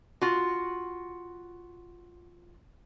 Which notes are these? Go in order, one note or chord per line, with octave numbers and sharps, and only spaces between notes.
F4 F#4